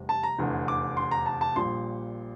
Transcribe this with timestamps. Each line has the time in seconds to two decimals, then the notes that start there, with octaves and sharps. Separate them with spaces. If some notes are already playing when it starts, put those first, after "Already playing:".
Already playing: F1 E2 C3 G3
0.09 A5
0.23 A#5
0.39 F1 E2 D3
0.68 D6
0.97 C6
1.11 A#5
1.26 A5
1.41 A5
1.56 A#1 A#2 G3 C6